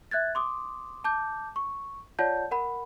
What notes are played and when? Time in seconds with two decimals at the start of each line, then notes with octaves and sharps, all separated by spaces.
0.11 E5 F#6 G#6 A6
0.35 C6 D6 D#6
1.04 A5 D6 G6
1.56 C#6
2.19 F4 C#5 D5 F#5 A5 G6
2.51 A#4 F#5 B5